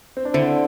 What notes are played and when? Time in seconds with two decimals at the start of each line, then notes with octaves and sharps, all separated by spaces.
0.17 C4
0.25 D4
0.34 D3 C4 E4